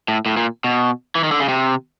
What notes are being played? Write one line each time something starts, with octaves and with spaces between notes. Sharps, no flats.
A2
A2
A#2
B2
E3
D#3
D3
C#3
C3